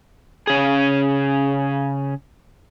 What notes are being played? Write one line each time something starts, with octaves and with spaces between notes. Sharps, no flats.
C#3 G#4